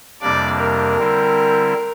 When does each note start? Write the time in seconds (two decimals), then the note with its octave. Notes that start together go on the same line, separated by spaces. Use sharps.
0.21 F2 C3 G3 A#3 D4 D5
0.59 A#4
0.98 D3 G3 C4 E4